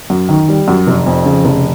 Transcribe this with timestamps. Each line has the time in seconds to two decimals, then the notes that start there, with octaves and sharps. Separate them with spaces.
0.10 F#2
0.29 D#3
0.48 G3
0.68 F#2
0.87 F1
1.06 F2
1.25 C#3
1.45 F1